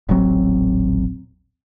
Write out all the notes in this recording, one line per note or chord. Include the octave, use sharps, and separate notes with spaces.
D#1 A1 F#3 C4